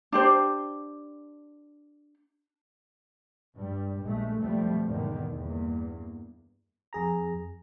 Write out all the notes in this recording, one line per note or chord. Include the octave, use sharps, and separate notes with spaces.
D4 G4 C5
G2 G3
A#1 G#3 A3
F2 B2 F3 G3 A3
E2 G#2 B2 D3 D#3
E2 G2 A#3
F2 G#4 A#5